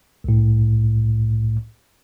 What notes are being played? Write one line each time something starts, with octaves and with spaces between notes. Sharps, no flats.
C2 A2